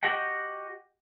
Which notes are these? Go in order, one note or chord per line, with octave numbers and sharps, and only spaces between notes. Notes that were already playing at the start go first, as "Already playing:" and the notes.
F#4 G4 D#5 F#5 G5